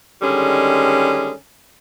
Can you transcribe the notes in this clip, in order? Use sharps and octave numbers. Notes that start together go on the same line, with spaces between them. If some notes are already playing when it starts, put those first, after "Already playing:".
D3 D#3 G3 G#3 C#4